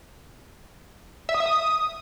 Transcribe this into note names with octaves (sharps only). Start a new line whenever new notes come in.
E5
D#6
E5
D#6